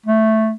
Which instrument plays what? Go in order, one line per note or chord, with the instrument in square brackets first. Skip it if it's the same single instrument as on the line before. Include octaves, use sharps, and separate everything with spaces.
[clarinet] A3